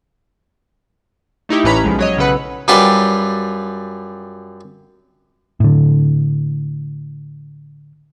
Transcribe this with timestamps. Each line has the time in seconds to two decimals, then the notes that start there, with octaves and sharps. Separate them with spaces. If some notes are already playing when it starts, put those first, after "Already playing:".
1.49 A3 D#4 E4 G4
1.64 A1 A2 C#4 B4 A#5 B5
1.84 B1 F3 G#3
1.99 F#3 C#5 D#5
2.17 B1 C#3 A4 B4 F#5
2.68 F#2 G3 F4 B4 D5
5.60 A2 D3